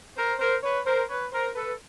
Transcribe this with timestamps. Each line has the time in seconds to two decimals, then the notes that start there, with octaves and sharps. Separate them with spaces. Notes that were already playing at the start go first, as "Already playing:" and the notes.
0.16 A#4 C5
0.40 A#4 C5
0.63 B4 C#5
0.86 A#4 C5
1.09 B4 C#5
1.32 A#4 C5
1.56 A4 B4